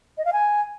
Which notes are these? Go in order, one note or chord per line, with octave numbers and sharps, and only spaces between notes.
D#5
F5
G#5